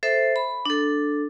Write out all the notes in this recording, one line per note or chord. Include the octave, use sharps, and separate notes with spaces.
A4 C5 E5
B5
D4 A4